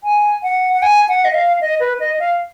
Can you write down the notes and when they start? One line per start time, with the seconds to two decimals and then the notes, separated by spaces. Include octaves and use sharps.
0.04 G#5
0.43 F#5
0.73 F#5
0.82 G#5
1.09 F#5
1.25 D#5
1.34 F5
1.61 D#5
1.80 B4
2.00 D#5
2.19 F5